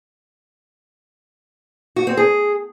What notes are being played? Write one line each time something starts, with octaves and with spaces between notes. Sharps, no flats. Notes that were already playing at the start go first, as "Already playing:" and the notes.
F#4
C4
G#4